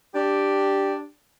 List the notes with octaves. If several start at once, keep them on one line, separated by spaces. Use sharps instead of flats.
D4 G4